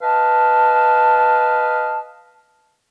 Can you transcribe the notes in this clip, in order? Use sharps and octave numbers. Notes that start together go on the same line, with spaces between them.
B4 D#5 F5 A5